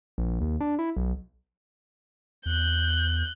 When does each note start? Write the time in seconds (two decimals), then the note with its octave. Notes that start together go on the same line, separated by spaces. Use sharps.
0.18 A#1
0.41 D#2
0.61 D4
0.79 E4
0.97 B1
2.46 E2 F#6 G6